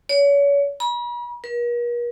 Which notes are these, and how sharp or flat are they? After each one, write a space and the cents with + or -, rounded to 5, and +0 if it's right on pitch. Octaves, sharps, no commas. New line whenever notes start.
C#5 +35
B5 -45
A#4 +45